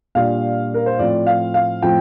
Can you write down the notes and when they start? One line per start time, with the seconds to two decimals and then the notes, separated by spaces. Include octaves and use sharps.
0.15 A#2 G3 D4 F4 F5
0.74 A#4
0.86 C5
0.99 A2 F3 C4 F4 D5
1.27 F5
1.54 F5
1.82 A2 F3 C4 F4 G5